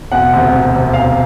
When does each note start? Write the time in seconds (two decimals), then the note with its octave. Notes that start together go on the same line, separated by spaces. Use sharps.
0.12 E1 F#5
0.32 D2 C3
0.53 E1
0.73 D2 C3
0.93 E1 F5